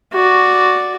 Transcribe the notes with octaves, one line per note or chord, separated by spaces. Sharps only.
F#4 D5